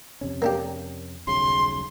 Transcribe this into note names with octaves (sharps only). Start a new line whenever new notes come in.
F2 C3 C#4
A#3 D4 G4
D#1 B1 C#3 C6